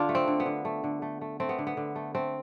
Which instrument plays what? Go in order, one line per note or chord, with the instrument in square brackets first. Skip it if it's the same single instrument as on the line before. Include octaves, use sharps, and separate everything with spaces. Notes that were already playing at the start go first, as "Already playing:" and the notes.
Already playing: [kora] D3 D4 F4
A3
C4
D3
B3
D3
A3
D3
A3
A3
A3 C4
B3
D3
B3
D3
A3
A3 C4